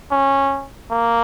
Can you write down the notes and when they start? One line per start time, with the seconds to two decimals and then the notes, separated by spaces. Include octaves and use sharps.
0.11 C#4
0.91 A#3